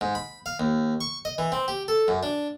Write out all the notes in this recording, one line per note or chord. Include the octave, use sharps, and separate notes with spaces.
G#2
B5
F5
D#2
C#6
D#5
E3
C4
G4
A4
F#2
D4